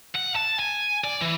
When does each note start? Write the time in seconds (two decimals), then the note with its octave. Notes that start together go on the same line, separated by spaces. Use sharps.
0.15 F#5
0.36 A5
0.59 G#5
1.04 D5
1.22 E3